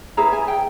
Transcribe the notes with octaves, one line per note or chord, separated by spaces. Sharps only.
E4 G#4 B4 A#5
G#5
G5